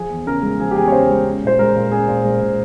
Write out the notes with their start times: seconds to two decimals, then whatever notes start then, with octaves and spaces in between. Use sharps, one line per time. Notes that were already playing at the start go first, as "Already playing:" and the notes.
Already playing: F3 G#4
0.10 E2
0.27 C#3 A#4
0.42 G#3
0.60 F3 G#4
0.71 G4
0.75 E2 G#4
0.88 C#5
0.92 C#3 C5
1.09 G#3
1.25 C#4
1.43 A#2 C5
1.59 G#3 A#4
1.75 A#2
1.91 C#4 G#4
2.08 A#2
2.24 G#3
2.41 A#2